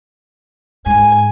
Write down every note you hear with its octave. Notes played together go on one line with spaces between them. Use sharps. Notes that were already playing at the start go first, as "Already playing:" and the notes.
G#2 G#5